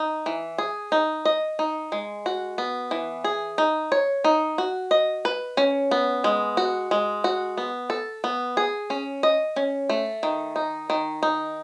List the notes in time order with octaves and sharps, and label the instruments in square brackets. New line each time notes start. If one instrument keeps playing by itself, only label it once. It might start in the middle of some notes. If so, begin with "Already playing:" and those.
Already playing: [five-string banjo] D#4
E3
G#4
D#4
D#5
D#4
G#3
F#4
B3
E3
G#4
D#4
C#5
D#4
F#4
D#5
B4
C#4
B3
G#3
F#4
G#3
F#4
B3
A4
B3
G#4
C#4
D#5
C#4
A3
D#3
D#4
D#3
D#4